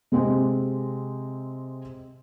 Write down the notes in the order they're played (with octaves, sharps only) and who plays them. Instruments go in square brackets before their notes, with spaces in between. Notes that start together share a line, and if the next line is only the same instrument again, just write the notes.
[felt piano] C3 G#3 C4 G4